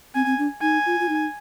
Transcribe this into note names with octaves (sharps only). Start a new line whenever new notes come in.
C4 G#5
C4
D4
D#4 G#5
F4
F4
D#4